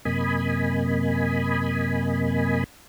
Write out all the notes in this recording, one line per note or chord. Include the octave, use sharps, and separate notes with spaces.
F#2 C3 A#3 D#5 G#5 B5